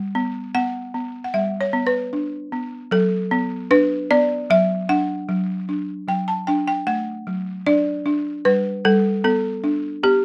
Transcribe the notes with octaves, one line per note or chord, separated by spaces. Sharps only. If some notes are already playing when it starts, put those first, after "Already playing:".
Already playing: G3
B3
B3 F#5
B3
F#5
G3 E5
C#5
B3
B4
D4
B3
F#3 A4
B3
D4 B4
B3 D5
F#3 E5
D4 F#5
F#3
D4
F#3 G5
A5
D4 G5
G5
A3 F#5
F#3
D4 D5
D4
G3 B4
G3 A4
B3 A4
D4
B3 G4